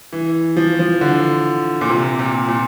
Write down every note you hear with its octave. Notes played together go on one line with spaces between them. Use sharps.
E3
F3
F3
D3
A#2
C3
A#2
A#2